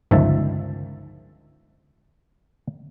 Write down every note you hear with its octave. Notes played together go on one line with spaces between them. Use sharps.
G1 C#2 D#3 F3 E5 A5